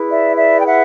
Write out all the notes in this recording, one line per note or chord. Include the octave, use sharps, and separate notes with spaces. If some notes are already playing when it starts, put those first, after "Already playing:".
Already playing: E4 G#4 B4
D5 E5
D5 E5
G5
E5 F#5